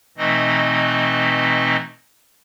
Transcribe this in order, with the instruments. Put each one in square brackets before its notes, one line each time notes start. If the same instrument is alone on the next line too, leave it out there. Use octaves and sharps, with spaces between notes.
[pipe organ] B2 E3 A3 C4 D#4 D#5